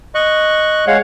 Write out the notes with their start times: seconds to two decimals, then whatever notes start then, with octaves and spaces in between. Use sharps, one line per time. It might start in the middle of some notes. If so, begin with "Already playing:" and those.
0.15 D#5 C#6 F#6
0.87 G#3 C#5 F5 F#5